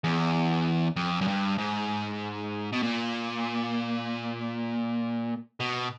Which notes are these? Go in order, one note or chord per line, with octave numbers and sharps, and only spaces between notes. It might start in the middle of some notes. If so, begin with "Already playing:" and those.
E2
F2
F#2
G2
G#2
B2
A#2
B2